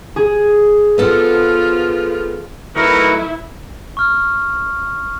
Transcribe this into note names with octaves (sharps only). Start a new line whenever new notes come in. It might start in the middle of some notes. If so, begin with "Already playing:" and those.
G#4
F3 B3 F4 A4 F#5
F#3 A3 D#4 E4 A#4 B4 C#6
C#6 F6